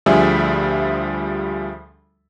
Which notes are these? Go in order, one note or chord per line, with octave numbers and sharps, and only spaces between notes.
D2 F3 G3 G#4 E5